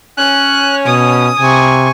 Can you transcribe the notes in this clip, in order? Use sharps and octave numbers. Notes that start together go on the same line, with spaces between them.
C#4 F#6
B2 D#6
C3 G#5 C#6